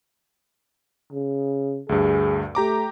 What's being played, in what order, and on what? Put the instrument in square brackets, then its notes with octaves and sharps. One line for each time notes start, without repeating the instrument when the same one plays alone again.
[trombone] C#3
[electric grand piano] D2 G2 [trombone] G#4
[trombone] A3 [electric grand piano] G4 A#5 D6